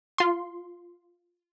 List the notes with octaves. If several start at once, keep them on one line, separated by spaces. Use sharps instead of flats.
F4 C6